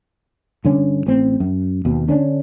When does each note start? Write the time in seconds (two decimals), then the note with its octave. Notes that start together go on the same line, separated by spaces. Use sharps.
0.65 G2 D3 C#4
1.07 A1 C4
1.40 F#2
1.85 D#2 B2
2.08 D3 C#4 D4